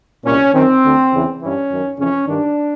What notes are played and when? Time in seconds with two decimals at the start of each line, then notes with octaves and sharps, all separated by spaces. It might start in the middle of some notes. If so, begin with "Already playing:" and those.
0.25 C2 A#2 C#4
0.54 F#2 D#3 C4
0.83 D2 D3
1.11 E2 C#3 E3
1.40 G2 E3 C#4
1.70 F#2 D#3
1.98 F2 C#3 E3 C#4
2.27 G2 D#3 D4